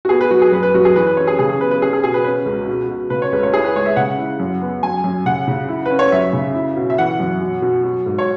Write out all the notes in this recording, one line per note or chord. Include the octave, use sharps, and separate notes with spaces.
F#4
B3 G#4
B4
F#3 F#4
G#4
F#2 B4
B4
F#2 F#4
G#4
E3 B4
B4
C#4 C#5
G#4
C#3 G#4
G#4
B3 B4
B4
C#4 G#4
G#4
B2 G#4
B4
C#4 B4
C#2
B2
B2
C#3 B4
C#5
C#2 B4
C#5
E4 G#4
B4
G#3 C#5
E5
C#3 F#5
E4
F#2
B3
F#2 G#5
F#2
C#3 F#5
C#3
E4
C#4 B4
C#5
F#2 E5
C#3
E4
B2
E5
E3 F#5
F#2
B2
B2
F#3
G#2
C#5